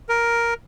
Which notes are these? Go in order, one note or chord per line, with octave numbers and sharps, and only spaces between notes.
A#4